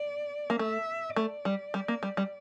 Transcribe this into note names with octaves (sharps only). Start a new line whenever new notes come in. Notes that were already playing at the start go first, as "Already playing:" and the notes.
Already playing: D5
A#3
A3 E5
A3 D5
G3
G3
A#3
G3
G3